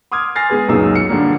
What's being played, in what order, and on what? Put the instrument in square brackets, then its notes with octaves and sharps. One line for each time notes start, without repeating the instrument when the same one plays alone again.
[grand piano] C6 D6 D#6 F6 G#6
G#5 F6 A6 A#6 C7
G#3 B3 G#4 B4
C#2 F#2 A#2 D#4 G#4 E6
C#7
G2 D3 F3 G3 A#3